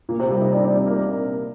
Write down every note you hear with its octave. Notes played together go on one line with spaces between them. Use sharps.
A#2 A#3
C3 C4
G3 G4
D#4 D#5
D4 D5
D4 D5
C4 C5
A#3 A#4